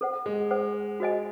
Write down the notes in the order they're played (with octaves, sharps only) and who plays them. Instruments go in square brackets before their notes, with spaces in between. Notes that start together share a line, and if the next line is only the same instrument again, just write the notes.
[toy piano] A4 C5 F#5
[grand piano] G#3
[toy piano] A4 C5 F#5
F#4 C5 D#5 G#5